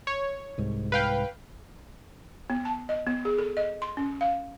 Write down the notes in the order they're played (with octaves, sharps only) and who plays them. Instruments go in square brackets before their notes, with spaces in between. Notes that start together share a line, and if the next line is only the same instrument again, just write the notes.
[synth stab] C#5
[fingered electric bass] C2 G#2
[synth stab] B4 F5 G5
[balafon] B3
A5
D#5
B3
G#4
A4
D#5
C6
C#4
F5